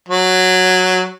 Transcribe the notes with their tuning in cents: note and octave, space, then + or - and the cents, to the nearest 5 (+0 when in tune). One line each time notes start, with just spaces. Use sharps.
F#3 -5